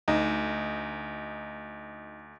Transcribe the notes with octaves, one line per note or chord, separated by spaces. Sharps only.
D2 D#4